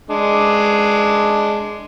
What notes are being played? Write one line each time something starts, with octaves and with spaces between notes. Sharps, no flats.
G#3 D4